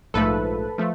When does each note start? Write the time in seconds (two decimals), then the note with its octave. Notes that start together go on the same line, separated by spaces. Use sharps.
0.14 A#1 G#2 F3 A3 A4 B4
0.78 F3 A3